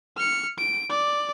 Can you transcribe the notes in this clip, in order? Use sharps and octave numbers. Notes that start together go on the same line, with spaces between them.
F6 C#7
D7
D5